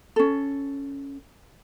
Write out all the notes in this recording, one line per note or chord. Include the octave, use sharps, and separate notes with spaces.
C#4 A4